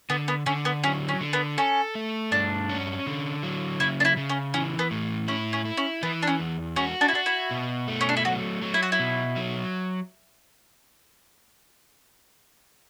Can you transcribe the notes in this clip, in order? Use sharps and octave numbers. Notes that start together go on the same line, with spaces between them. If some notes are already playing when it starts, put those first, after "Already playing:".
D3 B3
B3
D3 C#4
B3
F#3 C#4
C#4
D3
B3
C#4 A4
A3
G2 D4
C#4
D3
F#3
C#3 E4
D4
E4
C#3
C#4
E3 C#4
B3
A2
C#4 E4
C#4
E4
C#4
E3 B3
D4
C#4
E2
C#4 F#4
D4
E4
D4 F#4
E4
B2
A3
C#4
D4
E4
F#3 F#4
F#3
E4
F#4
E4
B2
F#3